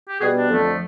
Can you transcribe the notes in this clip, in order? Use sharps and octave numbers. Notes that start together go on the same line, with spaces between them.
G4
B2 G3 B3 F#4 G#4
D4
F2 D3 F3 A3